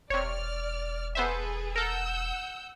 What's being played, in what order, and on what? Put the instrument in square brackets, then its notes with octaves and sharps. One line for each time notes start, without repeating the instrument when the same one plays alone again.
[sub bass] E1 [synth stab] C3 C#5 [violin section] D5 F6
[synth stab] B3 C5 E5 [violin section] G#4 A4 B4
[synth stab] A4 A#4 [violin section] F#5 E6 G6